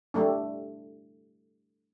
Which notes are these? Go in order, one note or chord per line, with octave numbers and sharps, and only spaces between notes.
G3 A3 D4